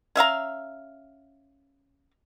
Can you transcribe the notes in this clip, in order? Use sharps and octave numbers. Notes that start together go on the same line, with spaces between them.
C#4 E5 F5 A#5